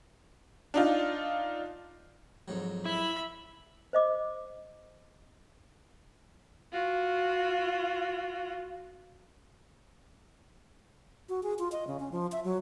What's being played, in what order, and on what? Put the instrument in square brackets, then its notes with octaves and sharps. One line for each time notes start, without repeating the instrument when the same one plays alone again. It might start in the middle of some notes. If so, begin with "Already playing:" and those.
[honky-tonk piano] D4 D#4 F4
[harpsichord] F2 G#2 F#3
[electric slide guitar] E4 [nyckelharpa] E5 B5
[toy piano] C5 D#5 D6
[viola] F4 F#4
[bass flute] F#4
G#4
F4
D#5
C#3
C#4
F3
E5
F#3